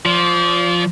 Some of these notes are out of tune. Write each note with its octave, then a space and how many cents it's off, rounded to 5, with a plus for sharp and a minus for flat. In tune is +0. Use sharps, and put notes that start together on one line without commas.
F3 +0 D5 -35